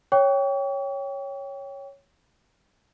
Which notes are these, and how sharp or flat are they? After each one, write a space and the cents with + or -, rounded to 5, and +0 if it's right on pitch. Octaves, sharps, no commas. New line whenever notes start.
C#5 +0 G5 +0 C#6 +40